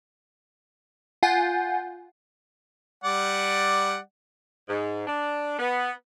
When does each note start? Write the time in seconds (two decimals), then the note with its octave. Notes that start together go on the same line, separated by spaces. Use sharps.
1.23 F4 F#5 G#5 G6
3.04 G3 D5 F#5
4.69 G#2
5.07 D4
5.58 B3